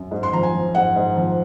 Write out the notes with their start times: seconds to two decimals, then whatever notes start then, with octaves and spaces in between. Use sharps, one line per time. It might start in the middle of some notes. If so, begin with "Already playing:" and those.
Already playing: F#2
0.11 G#2
0.23 C6
0.33 F3 A#5
0.43 G#5
0.53 F3
0.75 G#2 F#5
0.96 G#2
1.17 F3